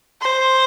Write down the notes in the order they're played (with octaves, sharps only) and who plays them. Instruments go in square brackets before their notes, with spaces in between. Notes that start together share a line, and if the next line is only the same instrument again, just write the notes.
[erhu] C5